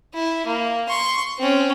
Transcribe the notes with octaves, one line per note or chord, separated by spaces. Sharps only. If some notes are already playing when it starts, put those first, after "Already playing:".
E4
A#3
C6 C#6
C4 C#4